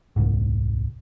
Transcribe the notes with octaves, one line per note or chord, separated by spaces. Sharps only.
D#1 C2 G#2